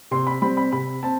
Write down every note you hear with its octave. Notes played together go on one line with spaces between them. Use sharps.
C3 C6
B5
G3 C4 B5
B5
C3 B5
C4 A5